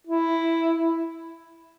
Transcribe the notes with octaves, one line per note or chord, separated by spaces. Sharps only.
E4